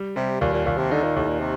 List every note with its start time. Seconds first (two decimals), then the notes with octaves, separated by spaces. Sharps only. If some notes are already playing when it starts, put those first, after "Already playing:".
Already playing: G3
0.16 C3 G3
0.41 D#2 A#2
0.54 A#2
0.65 D#2 A#2
0.78 C3
0.91 D3 D#4
1.03 A#2
1.16 D#2 A2
1.28 A#2
1.40 C3